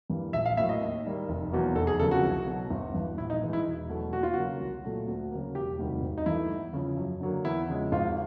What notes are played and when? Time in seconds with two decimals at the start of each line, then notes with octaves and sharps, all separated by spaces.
0.10 G2 E3 G3 A#3
0.33 A#1 E5
0.46 F5
0.57 A2 F#3 A#3 E5
0.69 D#5
0.81 D#2
1.04 D#3 G3 A#3
1.29 F1
1.52 E2 B2 F#3 A#3
1.75 F1 A4
1.87 G#4
1.99 F2 C#3 F#3 A#3 A4
2.11 F#4
2.23 C2
2.47 B2 F#3
2.70 G1
2.94 G2 E3
3.18 A#1 E4
3.30 D#4
3.42 G#2 E3 G#3
3.53 E4
3.65 E1
3.89 E2 B2 F#3 A3
4.13 D#2 F#4
4.23 F4
4.33 C#3 F#3 A#3 F#4
4.60 C2
4.84 A#2 F#3 A3
5.08 D2
5.31 C#3 F#3 A#3
5.55 E1 G4
5.79 D2 C3 D#3 G3
6.02 G#1
6.18 D#4
6.26 G2 E3 A3 E4
6.50 E2
6.73 C#3 F3
6.97 F#2
7.21 D3 F#3 A#3
7.44 E2 E4
7.69 C#3 F3 G#3
7.92 G#1 F4